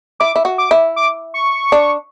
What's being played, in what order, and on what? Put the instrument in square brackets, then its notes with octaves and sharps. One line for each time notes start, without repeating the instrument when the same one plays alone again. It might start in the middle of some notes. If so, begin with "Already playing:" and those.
[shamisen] E4 [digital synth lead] D6
[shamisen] E4
F#4
[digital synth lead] D6
[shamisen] E4
[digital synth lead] D6
C#6
[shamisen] D4